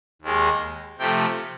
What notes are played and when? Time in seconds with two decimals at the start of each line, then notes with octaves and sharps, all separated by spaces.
0.22 D#2 D#3 G#3
0.99 C3 F3 A3 G5